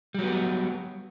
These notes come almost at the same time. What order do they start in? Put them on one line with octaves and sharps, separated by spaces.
G3 F#3 B3